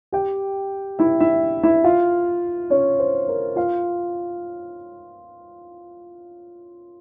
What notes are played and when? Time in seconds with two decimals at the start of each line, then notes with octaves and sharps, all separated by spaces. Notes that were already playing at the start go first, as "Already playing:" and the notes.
0.12 G4 G5
0.99 E4 E5
1.20 E4 E5
1.63 E4 E5
1.84 F4 F5
2.70 C#4 C#5
3.00 C5
3.28 A#4
3.56 F4 F5